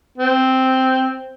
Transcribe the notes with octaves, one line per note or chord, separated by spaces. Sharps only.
C4